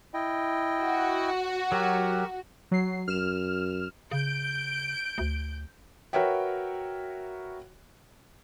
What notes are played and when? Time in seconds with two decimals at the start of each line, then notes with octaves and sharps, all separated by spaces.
0.14 E4 D#5 G5
0.82 F#4
1.72 F#3 G4 A#4
2.71 F#3 C7
3.08 F#2 F6 E7
4.11 C#3 G6 D7
5.18 D2
6.13 F#4 A#4 B4 C#5 E5 G5